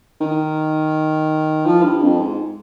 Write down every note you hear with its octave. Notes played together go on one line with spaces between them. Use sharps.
D#3
F3
G2
F2
G#2